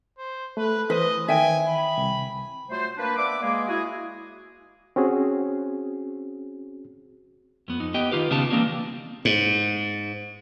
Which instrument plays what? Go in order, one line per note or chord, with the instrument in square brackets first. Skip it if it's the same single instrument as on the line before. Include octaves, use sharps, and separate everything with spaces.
[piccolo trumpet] C5
[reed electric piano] A3 [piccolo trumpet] B4
[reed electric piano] E3 C5 [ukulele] B4 [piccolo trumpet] D#5
[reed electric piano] D#3 [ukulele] E5 G5 [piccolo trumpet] G#5
[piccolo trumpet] B5
[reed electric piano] C2
[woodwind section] F#3 A3 F4 C5
A#3 D4 B4
B3 D5 E5 D6
G#3 A#3 G#4
E4 F#4 G#4
[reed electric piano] C4 C#4 F#4 G#4
[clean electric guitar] F2 B3
F2 D#4
B3 G4 D#5 G5
D#3 F3 D#4 F4 G4 B4
B1 C#3 B3 D#4 G4 A5
E3 G3 A#3 C4 D4 F#4
[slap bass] G#2